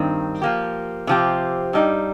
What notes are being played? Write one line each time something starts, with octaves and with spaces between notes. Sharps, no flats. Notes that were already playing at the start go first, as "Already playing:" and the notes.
Already playing: G2 D#3 C4
F3 A#3 G4
C3 F3 C4 G4
G2 G3 D#4